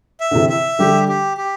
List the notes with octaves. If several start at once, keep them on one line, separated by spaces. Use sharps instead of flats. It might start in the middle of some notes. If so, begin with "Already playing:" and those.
E5
D3
C3 E3
E5
D3 G3 G4
G4
G4